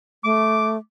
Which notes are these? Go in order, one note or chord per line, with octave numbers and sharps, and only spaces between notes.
A3 D6